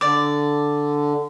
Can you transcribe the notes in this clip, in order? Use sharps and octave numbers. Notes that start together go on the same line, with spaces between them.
D3 D5 D6